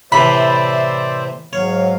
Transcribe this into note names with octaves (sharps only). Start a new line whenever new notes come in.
A2 C3 E3 C5 D5 E5 B5
G#2 F#3 C#5 F5